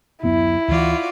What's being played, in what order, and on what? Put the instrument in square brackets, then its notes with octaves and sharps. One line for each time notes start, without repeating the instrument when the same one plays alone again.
[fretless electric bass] D1 F#2 B3 [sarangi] E4
[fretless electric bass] D2 E3 [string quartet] F4 F#4 D5